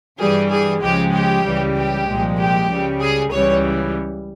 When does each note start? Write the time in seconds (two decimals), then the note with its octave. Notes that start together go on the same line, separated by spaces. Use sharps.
0.19 G2 E3 G3 G#4
0.50 G#4
0.82 C#2 C#3 F3 G#3 G4
1.13 G4
1.44 C#2 C#3 E3 G3
1.76 G4
2.07 C2 A#2 F3 G#3
2.37 G4
2.69 C#2 C#3 G3
3.00 G#4
3.31 C#2 C#3 E3 G3 C#5